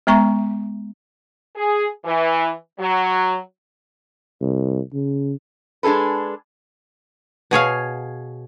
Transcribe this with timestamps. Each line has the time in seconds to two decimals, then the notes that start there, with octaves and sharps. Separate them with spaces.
0.07 G#3 B3 E5 A#5 C#6
1.56 G#4
2.05 E3
2.79 F#3
4.41 C2
4.93 C#3
5.83 G#3 D4 G#4 A4 B4
7.51 B2 G#4 C#5 F5